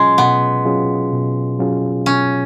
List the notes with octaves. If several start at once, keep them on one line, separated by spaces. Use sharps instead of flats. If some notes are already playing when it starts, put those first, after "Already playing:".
Already playing: B2 F#3 G#3 C#4 F4 G#4
B2 B3
F#3 C#4 F4 G#4
B2
F#3 C#4 F4 G#4
B2 C#4